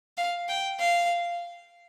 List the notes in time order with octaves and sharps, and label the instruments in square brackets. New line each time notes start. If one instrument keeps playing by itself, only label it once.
[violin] F5
G5
F5